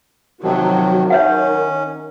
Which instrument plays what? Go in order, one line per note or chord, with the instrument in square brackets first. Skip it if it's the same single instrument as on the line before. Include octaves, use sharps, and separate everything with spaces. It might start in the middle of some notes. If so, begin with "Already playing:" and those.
[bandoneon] C3 D#3 F3 [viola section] F#3
[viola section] D#3 [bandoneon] C#4 [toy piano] C#5 E5 F#5